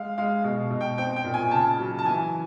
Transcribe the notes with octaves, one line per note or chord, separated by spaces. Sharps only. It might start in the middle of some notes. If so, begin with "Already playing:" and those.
Already playing: G#3 F5
G#3 F5
B2
B2
G5
C4 G5
G5
A#2
G#5
C#3 A5
F#3
A5
E3 G#5